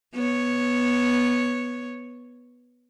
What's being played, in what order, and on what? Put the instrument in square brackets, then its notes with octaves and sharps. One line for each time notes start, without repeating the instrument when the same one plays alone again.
[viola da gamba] B3 C#5